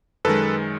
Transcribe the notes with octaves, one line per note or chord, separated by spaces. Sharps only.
F#2 D#3 G#3 A4 B4